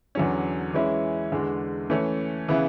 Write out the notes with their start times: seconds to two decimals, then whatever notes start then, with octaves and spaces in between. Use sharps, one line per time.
0.15 E2 D3 F#3 C#4
0.74 E3 G#3 C#4 E4
1.32 E2 D3 G#3
1.90 E3 A3 C#4
2.49 C#3 E3 B3 E4